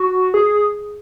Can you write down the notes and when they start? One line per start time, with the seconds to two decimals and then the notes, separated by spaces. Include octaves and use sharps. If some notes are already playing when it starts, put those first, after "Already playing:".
Already playing: F#4
0.34 G#4